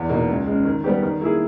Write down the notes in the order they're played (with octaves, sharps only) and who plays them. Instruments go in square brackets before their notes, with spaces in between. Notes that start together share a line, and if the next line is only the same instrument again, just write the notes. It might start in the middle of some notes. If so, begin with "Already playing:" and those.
Already playing: [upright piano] E2
B2 A#3 D#4
C#2
C#3 G#3
D#3
G3 B3 G4
D#3
A#3 E4 G#4